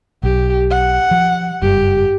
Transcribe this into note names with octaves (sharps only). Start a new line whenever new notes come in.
B1 G4
F#5
F3
F#1 G2 G4